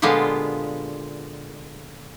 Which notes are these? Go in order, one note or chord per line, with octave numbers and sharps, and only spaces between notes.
A#2 D3 G#3 B3 F4 G4